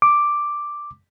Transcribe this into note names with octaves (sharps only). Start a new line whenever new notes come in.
D6